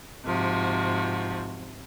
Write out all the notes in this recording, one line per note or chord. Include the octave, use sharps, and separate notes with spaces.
G#2 C3 F3 F#4